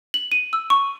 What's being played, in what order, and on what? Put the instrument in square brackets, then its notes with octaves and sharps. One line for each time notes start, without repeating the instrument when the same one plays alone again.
[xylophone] F#7
D#7
E6
C#6